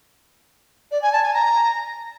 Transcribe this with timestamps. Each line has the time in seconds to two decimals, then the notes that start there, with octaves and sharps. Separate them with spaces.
0.91 D5
1.02 G#5
1.12 A5
1.23 G#5
1.34 A#5